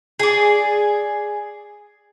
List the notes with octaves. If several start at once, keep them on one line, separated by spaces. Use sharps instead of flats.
G#4 D5